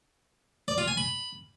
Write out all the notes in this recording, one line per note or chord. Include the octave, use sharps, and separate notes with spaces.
D5
F4
G#5
B5